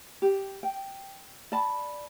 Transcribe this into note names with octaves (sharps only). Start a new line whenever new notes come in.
G4
G5
D5 A5 B5